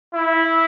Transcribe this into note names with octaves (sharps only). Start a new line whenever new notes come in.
E4